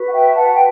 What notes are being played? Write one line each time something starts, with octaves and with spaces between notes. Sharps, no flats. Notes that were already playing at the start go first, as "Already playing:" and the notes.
Already playing: F#4 B4
F#5
E5 G5
F#5 A5
G5